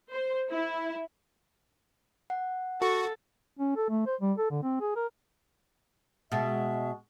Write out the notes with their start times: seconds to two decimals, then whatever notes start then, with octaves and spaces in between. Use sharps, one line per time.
0.12 C5
0.51 E4
2.30 F#5
2.82 F#4 A4 C#6
3.59 C#4
3.76 A4
3.89 A3
4.06 C5
4.21 G3
4.38 A4
4.51 D3
4.63 C4
4.81 G#4
4.96 A#4
6.32 B2 G#3 E5